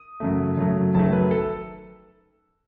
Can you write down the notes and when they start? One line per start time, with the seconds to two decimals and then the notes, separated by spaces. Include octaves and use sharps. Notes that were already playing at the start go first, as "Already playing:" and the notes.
Already playing: D#6
0.20 F#2 C#3 F#3 A3
0.57 F#2 C#3 F#3 A3
0.94 F#1 F#2 D#3 F#3 A3 A5
1.13 B4
1.31 A4